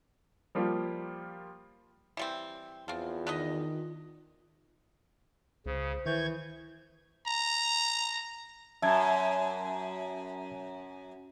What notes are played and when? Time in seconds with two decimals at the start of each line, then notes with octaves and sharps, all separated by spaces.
0.55 F3 G3 A#3 F4 G4
2.17 E3 G3 C4
2.88 E2 F3 C4 F4
3.27 D#3 D4 B4 D#5
5.66 C#2 C#3 C5
6.06 D#3 E3 C#6 G6 G#6
7.26 A#5
8.82 F#2 E5 A5 G#6